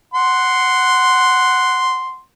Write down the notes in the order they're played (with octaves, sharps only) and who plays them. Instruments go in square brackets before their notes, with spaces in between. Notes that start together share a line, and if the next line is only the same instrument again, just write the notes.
[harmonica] F#5 C6